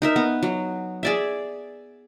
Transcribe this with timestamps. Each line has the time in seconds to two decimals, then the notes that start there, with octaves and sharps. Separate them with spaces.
0.02 D#4 A#4 E5
0.16 B3
0.43 F#3
1.03 G#4 D5 E5